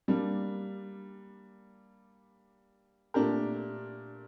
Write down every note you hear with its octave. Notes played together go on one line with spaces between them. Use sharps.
G3 A#3 D4
A#2 A3 D4 G4 A#4